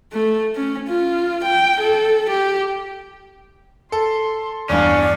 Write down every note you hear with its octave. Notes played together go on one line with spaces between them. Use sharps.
A3
C#4
F4
G5
A4
G4
A4 C6
E2 G2 C#4 D5 F5